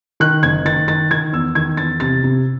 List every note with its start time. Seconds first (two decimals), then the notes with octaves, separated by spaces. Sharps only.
0.20 D#3 F#6
0.43 F#1 G#6
0.65 D#3 A6
0.88 D#3 A6
1.11 D#3 G#6
1.32 E2 E6
1.55 D#3 G#6
1.77 E2 A6
2.00 C3 A6
2.24 C3